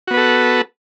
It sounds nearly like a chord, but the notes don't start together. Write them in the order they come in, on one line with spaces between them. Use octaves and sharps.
F#4 B3 B4 A4